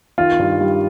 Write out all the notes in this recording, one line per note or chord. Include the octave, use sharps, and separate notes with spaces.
D#3 F4
G2
G3